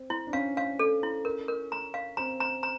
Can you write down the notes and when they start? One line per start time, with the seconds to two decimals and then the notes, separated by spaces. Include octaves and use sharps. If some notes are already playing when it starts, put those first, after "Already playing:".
Already playing: C4
0.10 E4
0.27 D4
0.33 C#4 F5
0.57 F5
0.79 A4
1.03 E4
1.25 A#4
1.48 A#4
1.72 A#5
1.94 F5
2.17 C4 A#5
2.40 A#5
2.63 A#5